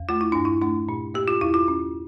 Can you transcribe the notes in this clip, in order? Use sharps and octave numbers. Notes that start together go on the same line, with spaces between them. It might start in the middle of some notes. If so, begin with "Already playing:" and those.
Already playing: E2
A3 F4
E4
G2 D4
E4
A3 D4
A#2
A#3 G4
F4
E2 E4
F4
C#4